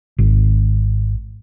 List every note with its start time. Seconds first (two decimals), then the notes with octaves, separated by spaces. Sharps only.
0.19 G#1